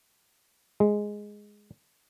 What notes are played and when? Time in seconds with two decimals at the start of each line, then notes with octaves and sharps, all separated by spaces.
0.80 G#3